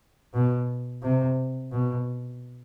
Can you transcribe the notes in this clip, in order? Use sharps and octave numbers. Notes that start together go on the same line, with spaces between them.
B2
C3
B2